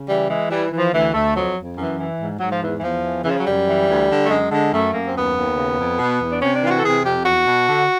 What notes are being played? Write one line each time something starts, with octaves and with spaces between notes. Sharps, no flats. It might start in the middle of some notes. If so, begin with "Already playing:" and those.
Already playing: C#3
E3 G3
E3 G#3
E3 G3
E3
F3
D2 E3
D2 A3
F2 F#3
F2
F#2 E3
E3
G#2
G#2 F#3
F3
E2 E3
E3
E2 F3
E3
C#3 E3
F3
F#3
F#2 G3
E3
D2
D3
A3
F#2 G#3
D3 G#3
F#2 A3
F#2 A#3
C4
D#2 B3
D#2
C#3
F2
B2
E2
D4
C3 C#4
D4
E3 F4
F#4
A4
C3 G#4
F2 G4
E2 F#4
B2
D3